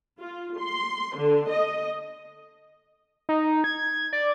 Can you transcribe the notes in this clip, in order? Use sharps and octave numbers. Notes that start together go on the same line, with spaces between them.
F4
C6
D3
D#5
D#4
G#6
D5